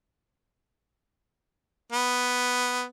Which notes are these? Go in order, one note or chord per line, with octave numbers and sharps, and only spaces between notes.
B3